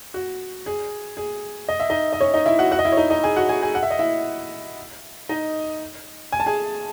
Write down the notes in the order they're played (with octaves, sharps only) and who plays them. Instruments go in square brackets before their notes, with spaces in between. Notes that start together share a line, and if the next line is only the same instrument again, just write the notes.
[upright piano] F#4
G#4
G#4
D#5
E5
D#4 D#5
D#5
C#4 C#5
D#4 D#5
E4 E5
F#4 F#5
F#4 F#5
D#5
E4 E5
C#5
D#4 D#5
D#4 D#5
G#4 G#5
F#4 F#5
G#4 G#5
G#4 G#5
F#5
E5
D#5
E4 E5
D#4 D#5
G#5
A5
G#4 G#5